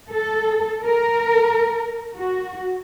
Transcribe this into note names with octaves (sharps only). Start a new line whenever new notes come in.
A4
A#4
F#4